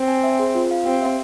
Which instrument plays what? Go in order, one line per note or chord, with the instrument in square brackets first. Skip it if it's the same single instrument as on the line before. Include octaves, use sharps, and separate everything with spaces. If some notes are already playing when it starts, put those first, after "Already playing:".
Already playing: [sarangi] C4
[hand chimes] G#5
E5
G#4
F4
F5
[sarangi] C4 [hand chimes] G4
[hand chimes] E5